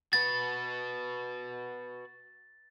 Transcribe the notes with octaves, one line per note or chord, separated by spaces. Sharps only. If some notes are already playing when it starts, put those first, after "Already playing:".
F#4 B4 A6